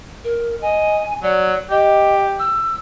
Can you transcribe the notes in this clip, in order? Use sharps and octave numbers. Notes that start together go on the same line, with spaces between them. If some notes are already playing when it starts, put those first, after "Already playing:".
A#4
D#5 G#5
F#3 D5
G4 D#5
E6